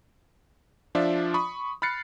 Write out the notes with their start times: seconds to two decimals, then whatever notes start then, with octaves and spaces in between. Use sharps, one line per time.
0.95 F3 D4 F4 D5 E5
1.34 B5 C#6 D#6
1.82 B5 F6 F#6 A6 C7 C#7